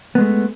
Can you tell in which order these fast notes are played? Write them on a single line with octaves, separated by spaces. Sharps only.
B3 G#3 A3